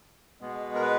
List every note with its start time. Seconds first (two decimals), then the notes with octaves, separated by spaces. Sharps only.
0.41 B2 G#3 B3
0.75 A#4
0.81 B4